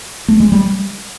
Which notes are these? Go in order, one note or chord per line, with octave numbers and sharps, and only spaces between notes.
A3
G#3
G3